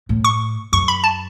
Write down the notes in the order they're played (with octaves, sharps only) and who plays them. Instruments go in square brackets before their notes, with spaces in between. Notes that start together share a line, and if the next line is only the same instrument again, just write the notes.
[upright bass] A2
[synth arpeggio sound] C#6
[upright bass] F#2 [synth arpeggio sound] C#6
[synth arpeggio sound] B5
A5